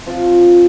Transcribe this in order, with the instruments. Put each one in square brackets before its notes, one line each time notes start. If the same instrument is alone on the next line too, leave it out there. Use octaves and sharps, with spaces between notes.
[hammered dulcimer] F3 C4 F4